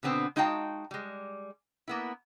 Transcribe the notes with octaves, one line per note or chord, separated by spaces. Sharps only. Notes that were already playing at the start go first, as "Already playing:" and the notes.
B2 D3 B3 C4
G#3 D#4 F#4 F5 G5 A5
G3 G#3
A#3 B3 E4